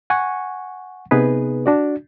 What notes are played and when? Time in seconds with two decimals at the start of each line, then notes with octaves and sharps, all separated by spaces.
0.10 F#5 G#5 C#6
1.11 C3 B3 D#4 G#4 B4
1.66 D4 F#4 D5